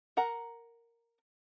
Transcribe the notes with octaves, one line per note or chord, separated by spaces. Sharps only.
A#4 F#5 A#5